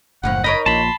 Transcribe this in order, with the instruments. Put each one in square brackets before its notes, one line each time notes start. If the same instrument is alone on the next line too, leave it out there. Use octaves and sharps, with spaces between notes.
[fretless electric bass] F#1 [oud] F#2 A2 F3 [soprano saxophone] F#5
[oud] D#4 A#4 C#5 [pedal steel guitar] D#5 [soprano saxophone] B5
[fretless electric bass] A#1 A#2 [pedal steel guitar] A5 B5 [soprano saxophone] C6